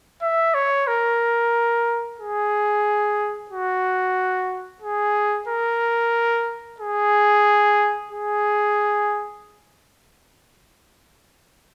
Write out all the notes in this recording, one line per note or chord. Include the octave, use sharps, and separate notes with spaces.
E5
C#5
A#4
G#4
F#4
G#4
A#4
G#4
G#4